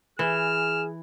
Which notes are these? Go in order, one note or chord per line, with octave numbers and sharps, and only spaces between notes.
E3 G#4 F6 E7